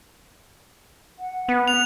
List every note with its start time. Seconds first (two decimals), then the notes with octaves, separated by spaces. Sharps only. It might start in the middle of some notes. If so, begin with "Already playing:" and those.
1.19 F#5
1.49 B3
1.68 F#6 F7